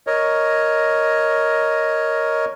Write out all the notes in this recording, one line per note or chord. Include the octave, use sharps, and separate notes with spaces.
A#4 C#5 D#5